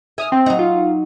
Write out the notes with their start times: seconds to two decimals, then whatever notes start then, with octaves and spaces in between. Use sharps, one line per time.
0.18 E5 G#5 D#6 F6
0.32 C4
0.46 F#3 D#4
0.59 F4